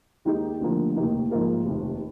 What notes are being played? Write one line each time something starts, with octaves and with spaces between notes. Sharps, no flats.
D#2 D#3 G#3 D#4 G4
D2 D3 F3 A#3
F1 D#2 D#3 A#3 D#4
G#2 F3 A#3 F4 A#4
F1 D#2 D#3